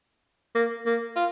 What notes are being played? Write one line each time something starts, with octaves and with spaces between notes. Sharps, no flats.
A#3
A#3
F4